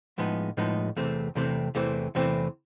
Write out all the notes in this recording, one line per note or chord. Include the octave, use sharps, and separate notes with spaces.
A2 F3 G#3 B3 D#4
A2 F3 G#3 B3 D#4
E2 C3 E3 A3 C4
E2 C3 E3 A3 C4
E2 C3 E3 A3 C4
E2 C3 E3 A3 C4